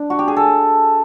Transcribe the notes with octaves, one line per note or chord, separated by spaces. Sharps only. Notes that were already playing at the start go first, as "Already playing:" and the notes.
Already playing: D4
F#4
G4
G#4
A4